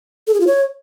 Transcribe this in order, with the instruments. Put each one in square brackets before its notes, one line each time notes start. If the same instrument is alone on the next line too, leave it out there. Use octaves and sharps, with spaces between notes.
[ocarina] A4
G#4
F4
C#5